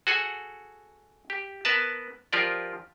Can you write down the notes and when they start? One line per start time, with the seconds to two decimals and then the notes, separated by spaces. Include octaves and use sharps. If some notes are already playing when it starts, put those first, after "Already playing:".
0.07 F#4 G#4 A4 F#5 G#5
1.30 G4
1.65 B3 A#4 B4 A5
2.33 F3 F4 G4 A#4 D5